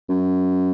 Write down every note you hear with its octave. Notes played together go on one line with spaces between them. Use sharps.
F#2